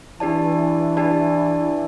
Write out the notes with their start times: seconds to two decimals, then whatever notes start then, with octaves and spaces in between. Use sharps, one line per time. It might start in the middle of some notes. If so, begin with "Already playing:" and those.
0.20 E3 D4 G4 D5 A5
0.97 D4 G4 D5 A5